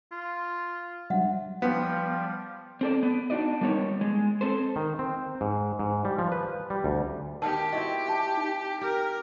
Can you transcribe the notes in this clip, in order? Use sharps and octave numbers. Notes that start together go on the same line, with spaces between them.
F4
F#3 G3 D4 E5 F#5
F3 G3 B3
C4 A4 D5
B3
D4 D#4 F#4 D5 D#5
G3 A#3 B3 D#4 C5 C#5
G#3
C4 A4 C5
D#3
C4
G#2
G#2
G3
F3
B4
G3
D2
D#3 B3 G4 A#4 A5
C4 E4 F#4 D#5
G5 A5
D#4 G5
G4 A#4